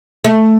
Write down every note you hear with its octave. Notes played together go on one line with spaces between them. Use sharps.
A3